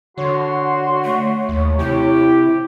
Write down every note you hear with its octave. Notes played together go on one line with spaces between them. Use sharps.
D3 F#4 C#5 C6
A3
D#2
C3 E4 G4